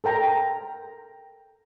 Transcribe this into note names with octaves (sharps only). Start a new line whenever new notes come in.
A4 A#4 G5 A#5